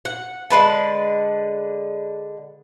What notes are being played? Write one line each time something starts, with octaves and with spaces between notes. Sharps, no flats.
F#5
D3 G#3 B4 A5